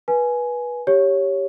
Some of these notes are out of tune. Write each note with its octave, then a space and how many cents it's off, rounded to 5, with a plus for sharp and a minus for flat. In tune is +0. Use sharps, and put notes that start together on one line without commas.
B4 -20 G#5 +15
G4 +0 C#5 +0